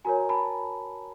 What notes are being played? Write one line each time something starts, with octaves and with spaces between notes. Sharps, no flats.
F#4 A#4 C#5 G#5 A#5
A5 B5